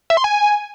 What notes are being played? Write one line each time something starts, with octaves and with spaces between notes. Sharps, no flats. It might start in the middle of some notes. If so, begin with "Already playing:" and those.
E5
C6
G#5